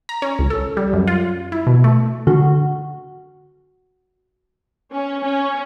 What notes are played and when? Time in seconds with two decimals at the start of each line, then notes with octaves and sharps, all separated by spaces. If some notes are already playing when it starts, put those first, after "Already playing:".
0.09 A#5
0.22 C#4
0.39 C#2
0.50 A4
0.77 G3
0.93 F#2
1.07 F4
1.52 E4
1.67 B2
1.84 A3
2.27 D3 F#4
4.92 C#4
5.23 C#4